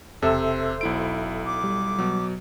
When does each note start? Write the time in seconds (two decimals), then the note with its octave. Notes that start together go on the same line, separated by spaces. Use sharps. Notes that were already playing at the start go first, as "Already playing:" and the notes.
0.22 E1 C3 A4 C5 E5 E6
0.81 B1 E4 D7
1.46 D6
1.64 G3
1.98 B2 F#3